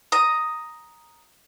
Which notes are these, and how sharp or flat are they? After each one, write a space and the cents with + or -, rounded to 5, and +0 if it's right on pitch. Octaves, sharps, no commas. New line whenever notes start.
A#5 +0 D#6 +5